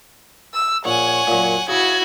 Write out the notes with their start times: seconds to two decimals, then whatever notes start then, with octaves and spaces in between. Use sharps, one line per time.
0.54 E6
0.85 A#1 C#5 F#5 G#5
1.27 F#2 A#2
1.68 C#3 E4 F#4 G#6